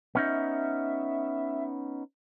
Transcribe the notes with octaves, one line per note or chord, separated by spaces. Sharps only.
B3 C#4 D#4 E5